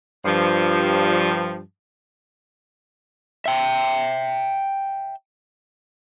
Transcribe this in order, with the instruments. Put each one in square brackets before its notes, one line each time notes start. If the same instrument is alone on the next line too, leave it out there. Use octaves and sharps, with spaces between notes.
[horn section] G2 F3
[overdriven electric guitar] E5 G5